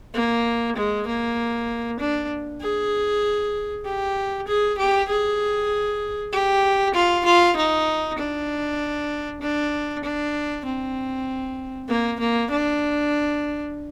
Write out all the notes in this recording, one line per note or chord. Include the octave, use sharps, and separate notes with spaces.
A#3
G#3
A#3
D4
G#4
G4
G#4
G4
G#4
G4
F4
F4
D#4
D4
D4
D4
C4
A#3
A#3
D4